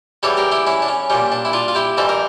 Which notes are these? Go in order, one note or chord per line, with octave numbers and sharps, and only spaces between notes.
E2 E3 G3 A4 C#5
G4 A#4
E4 G4
C#4 E4
D4
C#4
A#2 G3 C#4
D4
E4
D4 F4
F4
E4 G4
F2 E3 G3 A4
A#4